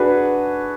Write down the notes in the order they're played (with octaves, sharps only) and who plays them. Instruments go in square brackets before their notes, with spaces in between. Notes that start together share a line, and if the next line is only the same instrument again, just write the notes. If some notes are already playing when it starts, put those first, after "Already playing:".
Already playing: [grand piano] D4 F#4 G#4 B4